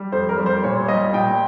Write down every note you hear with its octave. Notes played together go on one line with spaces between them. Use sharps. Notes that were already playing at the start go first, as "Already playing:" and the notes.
Already playing: G3
F2 C5
A#4
G3
C5
A#2 C#5
G3 D#5
A#2 G5